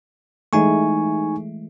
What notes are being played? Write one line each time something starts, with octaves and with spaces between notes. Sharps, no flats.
E3 G#3 A3 D#4 G#5 C#6